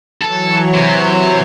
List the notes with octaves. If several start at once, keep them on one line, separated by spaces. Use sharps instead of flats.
E3 F#3 A4 C#5
C3